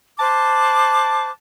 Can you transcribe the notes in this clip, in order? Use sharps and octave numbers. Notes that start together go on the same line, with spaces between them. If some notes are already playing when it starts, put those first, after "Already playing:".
C5 A5 D6 F#6